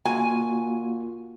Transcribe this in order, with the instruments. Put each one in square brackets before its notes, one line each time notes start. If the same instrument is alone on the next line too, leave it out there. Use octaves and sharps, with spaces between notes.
[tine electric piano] A#3 F4 F#4 [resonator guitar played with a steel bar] G#5